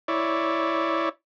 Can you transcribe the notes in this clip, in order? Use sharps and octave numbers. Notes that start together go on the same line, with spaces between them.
E4 C#5 D5